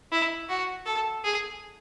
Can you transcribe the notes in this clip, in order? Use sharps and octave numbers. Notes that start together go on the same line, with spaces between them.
E4
F#4
A4
G#4